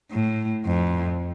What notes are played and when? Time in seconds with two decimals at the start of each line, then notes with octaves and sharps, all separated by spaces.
0.11 A2
0.66 F2